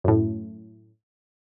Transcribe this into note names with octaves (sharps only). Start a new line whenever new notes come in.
F#2 A2